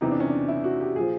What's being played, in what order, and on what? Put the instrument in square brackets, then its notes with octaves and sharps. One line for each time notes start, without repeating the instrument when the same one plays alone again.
[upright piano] E2 C3 E3 D#4
D4
C#4
D4
E4
F#4
G4
A#2 F3 G#4